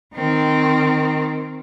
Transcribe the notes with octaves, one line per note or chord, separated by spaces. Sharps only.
D#3 C4